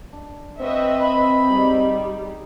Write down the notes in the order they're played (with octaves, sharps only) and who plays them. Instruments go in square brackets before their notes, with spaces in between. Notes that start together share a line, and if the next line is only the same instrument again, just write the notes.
[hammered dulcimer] D4
[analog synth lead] C4 [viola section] B4 D#5 E5 [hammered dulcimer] F#5 C#6
[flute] B5
[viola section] G3 [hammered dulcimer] D#4 G#4 D#5